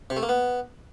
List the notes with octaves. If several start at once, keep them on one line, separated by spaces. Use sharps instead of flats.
C3
A3
A#3
B3